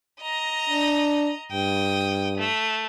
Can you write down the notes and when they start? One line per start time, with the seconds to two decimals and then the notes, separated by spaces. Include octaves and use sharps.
0.22 D#5 A#5
0.70 D4
1.52 G2 G5 D#6
2.37 A3